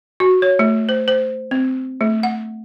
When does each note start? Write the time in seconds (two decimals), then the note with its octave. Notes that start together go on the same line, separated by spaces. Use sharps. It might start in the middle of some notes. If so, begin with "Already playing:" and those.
0.20 F#4
0.42 C#5
0.59 A3
0.89 C5
1.08 C5
1.51 C4
2.01 A3
2.23 F#5